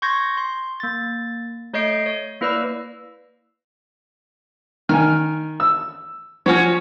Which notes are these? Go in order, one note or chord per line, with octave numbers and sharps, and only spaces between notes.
C6 C#6 G6 G#6 A#6
C6
A#3 A6
A3 C#5 D#5 G6 C7 D7
C#5
A#3 E4 B4 D5 E6
D#3 G#5 F6
E6
F3 C#4 F#4 C#5